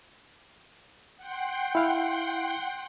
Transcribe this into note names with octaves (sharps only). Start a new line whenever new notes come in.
F#5 G5 C6
E4 F5